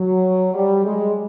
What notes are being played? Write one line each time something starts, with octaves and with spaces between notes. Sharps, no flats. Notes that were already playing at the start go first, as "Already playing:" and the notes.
Already playing: F#3
G3
G#3